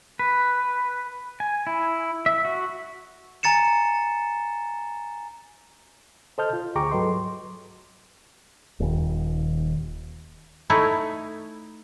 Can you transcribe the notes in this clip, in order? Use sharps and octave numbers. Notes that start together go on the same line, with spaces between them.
B4
G#5
E4
E5
F#4
G#5 A#5 A6 C#7 E7
A4 C5 D#5 A5 F6 G6
F4
D2 G#4 G5 A#5 C#6 D6
G#2 F#3 A4 B4 D#5 C6
D#1 D#2
A3 D#4 E4 C#5